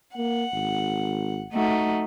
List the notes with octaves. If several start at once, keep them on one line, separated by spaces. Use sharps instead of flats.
A#3 F#5
G#1
A3 D#4 F#4